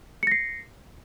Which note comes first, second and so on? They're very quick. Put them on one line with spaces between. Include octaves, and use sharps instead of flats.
C#7 A#6 C7